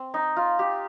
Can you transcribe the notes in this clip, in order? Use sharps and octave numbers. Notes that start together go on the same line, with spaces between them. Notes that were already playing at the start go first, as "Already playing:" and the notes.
Already playing: C4
D#4
F4
G4